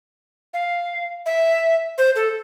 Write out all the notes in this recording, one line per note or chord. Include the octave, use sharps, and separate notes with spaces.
F5
E5
C5
A4